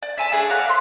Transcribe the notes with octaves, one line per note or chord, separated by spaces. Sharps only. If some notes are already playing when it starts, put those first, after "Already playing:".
D5
E5 G#5 A5
A3 D4 G#4 G#5
D5 F5 F#5 A#5
E5 C6